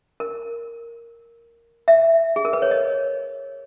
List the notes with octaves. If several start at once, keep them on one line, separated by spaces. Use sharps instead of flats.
A#4
E5
G#4
A#4
B4
C#5
D#5